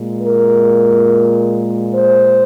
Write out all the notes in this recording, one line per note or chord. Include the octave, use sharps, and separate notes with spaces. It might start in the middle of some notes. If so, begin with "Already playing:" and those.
Already playing: A#2 G#3
A#4
C5